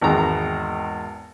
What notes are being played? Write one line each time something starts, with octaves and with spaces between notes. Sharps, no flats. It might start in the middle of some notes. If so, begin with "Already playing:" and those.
G#1 E2 D#3 G#3 B3 A#5